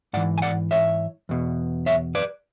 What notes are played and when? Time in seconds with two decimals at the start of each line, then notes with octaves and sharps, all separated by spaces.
0.13 G#2 E3 D5 F#5
0.38 G#5
0.42 D5 F#5
0.71 C#5 E5
1.29 E2 B2
1.86 C#5 E5
2.15 B4 D5